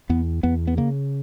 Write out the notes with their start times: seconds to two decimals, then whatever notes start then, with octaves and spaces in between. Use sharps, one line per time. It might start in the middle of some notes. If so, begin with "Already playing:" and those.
0.09 E2 B3
0.43 E2 B3
0.67 B3
0.77 C#3 A#3